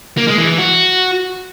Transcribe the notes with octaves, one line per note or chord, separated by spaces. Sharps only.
A#3
G#3
E3
E3
F#4